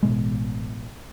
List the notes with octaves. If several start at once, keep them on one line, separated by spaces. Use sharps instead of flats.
A1 B2 G#3